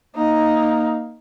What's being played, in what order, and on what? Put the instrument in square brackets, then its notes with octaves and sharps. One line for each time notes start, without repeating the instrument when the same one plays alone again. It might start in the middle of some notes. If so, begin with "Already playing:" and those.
[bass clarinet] A#3 [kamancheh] D#4